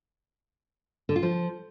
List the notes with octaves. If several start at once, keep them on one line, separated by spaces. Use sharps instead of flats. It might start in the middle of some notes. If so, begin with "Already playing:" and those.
D3
F4
F3